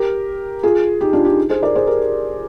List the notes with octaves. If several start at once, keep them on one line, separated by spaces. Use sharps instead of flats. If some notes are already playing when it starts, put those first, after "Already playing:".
Already playing: G4 A#4
F4 G#4
D#4 G4
D4 F4
D#4 G4
G#4 C5
A#4 D5
G#4 C5
G4 A#4